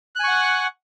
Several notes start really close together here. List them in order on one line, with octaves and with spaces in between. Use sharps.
F#6 G#5 C#6 F#5